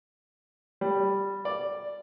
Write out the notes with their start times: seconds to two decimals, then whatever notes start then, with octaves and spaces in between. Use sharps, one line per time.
0.81 G3
1.45 D5